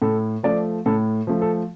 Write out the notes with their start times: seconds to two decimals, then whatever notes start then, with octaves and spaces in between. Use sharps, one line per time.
0.02 A2 A4
0.43 F3 A3 D5
0.86 A2 A4
1.27 F3 A3
1.42 A4